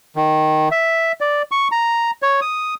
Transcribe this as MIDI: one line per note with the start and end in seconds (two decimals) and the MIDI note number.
0.16 0.69 51
0.71 1.12 76
1.21 1.42 74
1.52 1.68 85
1.72 2.11 82
2.22 2.40 73
2.41 2.75 87